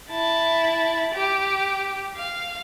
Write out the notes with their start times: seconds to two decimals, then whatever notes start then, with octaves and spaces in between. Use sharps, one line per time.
0.10 E4 A5
1.14 G4
2.16 F5